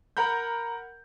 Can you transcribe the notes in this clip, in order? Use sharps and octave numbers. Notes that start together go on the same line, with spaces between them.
A#4 F#5 A#5 B5 G6